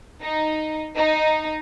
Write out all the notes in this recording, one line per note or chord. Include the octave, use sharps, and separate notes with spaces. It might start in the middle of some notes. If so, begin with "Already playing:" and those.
D#4
D#4